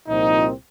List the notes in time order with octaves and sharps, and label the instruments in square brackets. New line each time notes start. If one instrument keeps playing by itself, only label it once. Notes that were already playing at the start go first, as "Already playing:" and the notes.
[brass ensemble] C2 A#2 F3 C4 D#4